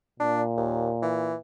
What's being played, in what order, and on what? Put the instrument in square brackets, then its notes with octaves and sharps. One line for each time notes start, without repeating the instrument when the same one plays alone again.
[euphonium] A#2 [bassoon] D4
[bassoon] D#2
E3